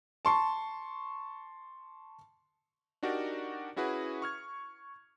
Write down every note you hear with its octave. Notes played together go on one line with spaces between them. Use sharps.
A5 C6 C#6
D4 D#4 F#4 G4 A#4 D5
C#4 E4 F#4 G#4 B4
C#6 F6 G#6